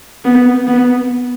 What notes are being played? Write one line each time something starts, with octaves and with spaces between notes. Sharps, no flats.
B3
B3